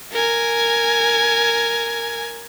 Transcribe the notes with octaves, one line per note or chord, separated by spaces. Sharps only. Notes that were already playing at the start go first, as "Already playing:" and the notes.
A#4 G#5